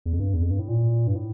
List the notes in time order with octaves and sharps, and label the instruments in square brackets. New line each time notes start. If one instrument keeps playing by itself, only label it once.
[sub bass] E2
F2
G2
E2
F2
G2
A2
A#2
G2
A2